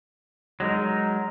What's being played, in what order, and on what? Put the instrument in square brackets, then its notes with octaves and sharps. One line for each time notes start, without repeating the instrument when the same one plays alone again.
[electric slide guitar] F#3 G#3 D#4 A#4